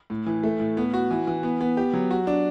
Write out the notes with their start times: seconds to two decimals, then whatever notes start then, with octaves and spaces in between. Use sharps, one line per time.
0.10 A2
0.26 E3
0.43 A3
0.60 A2
0.77 B3
0.94 F#4
1.11 E3
1.27 E3
1.43 B3
1.61 B3
1.77 G4
1.94 F#3
2.11 F#4
2.27 D4